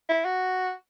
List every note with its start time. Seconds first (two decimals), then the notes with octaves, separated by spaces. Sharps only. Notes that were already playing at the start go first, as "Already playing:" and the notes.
0.09 E4
0.25 F#4